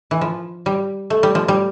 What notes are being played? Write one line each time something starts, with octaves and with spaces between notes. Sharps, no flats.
E3
F3
G3
A3
G3
F3
G3